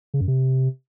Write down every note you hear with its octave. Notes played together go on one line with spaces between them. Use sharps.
C#3
F#2
C3